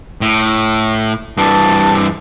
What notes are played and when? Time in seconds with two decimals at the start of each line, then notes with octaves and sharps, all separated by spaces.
0.21 A2
1.38 G2 E3 A5